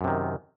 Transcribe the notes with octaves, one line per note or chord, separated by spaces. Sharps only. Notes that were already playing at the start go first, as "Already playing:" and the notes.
F#2 C3 D#3